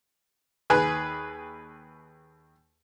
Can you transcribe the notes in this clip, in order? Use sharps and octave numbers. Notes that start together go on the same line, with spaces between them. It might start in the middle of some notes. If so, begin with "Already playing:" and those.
D#2 G#4 B4 G#5 F#6